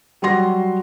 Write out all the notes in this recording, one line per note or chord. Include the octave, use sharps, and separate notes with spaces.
F#3 G3 F#4 C6 A#6